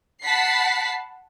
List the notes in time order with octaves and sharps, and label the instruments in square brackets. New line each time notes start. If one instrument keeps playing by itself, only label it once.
[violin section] F#5 A5 B5 B6 C7